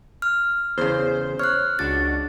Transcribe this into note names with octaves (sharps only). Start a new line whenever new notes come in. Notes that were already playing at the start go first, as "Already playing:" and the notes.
F6
E2 C#3 C5
C#5 F6 F#6
C#2 D4 F#4 A6